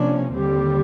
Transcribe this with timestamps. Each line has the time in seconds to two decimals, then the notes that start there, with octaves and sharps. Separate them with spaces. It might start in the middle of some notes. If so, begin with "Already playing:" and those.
Already playing: C3 F3 A#3 C#4 D4
0.33 D#2 D3 G3 C4 G4